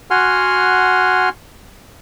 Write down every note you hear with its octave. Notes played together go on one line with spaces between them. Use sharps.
F#4 F#5 G#5 C6 F6